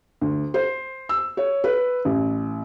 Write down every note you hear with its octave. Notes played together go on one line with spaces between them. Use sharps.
D2
C5
E6
C#5
B4
A1